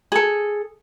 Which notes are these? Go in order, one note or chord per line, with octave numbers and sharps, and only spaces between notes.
G#4 A4